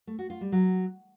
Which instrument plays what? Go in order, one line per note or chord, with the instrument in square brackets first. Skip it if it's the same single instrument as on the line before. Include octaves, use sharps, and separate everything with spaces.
[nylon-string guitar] A3
F#4
F4
G3
F#3